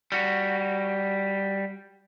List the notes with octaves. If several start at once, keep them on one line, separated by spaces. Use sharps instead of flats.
G3 F#4